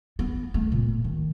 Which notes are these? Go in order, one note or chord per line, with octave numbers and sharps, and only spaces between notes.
B3
A3
A#2
D#3